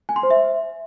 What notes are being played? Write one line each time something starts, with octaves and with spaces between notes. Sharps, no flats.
G#5
C6
C5
E5